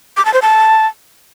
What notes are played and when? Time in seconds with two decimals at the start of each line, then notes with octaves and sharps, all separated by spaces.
0.17 D6
0.25 A5
0.34 C5
0.42 A5